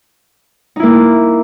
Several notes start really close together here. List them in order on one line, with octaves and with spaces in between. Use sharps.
D#4 E4 A#3